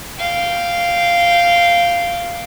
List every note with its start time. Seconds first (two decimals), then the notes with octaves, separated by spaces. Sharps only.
0.17 F5 G5